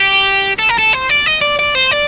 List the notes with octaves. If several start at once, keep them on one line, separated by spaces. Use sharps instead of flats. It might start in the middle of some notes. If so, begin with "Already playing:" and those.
Already playing: G4
A4
A#4
A4
C5
D5
D#5
D5
D5
C5
D5